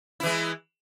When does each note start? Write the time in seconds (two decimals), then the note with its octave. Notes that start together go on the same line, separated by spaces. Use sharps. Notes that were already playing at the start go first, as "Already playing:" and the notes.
0.20 E4
0.23 E3
0.27 G#3